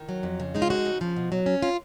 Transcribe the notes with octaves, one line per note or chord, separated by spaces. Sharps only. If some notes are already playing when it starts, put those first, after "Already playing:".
Already playing: D#3
F#3
F2
C#3
G#3 D#4
F4
F2 D#4 F#4
C#3
F3
B2
F#3
C#4
F4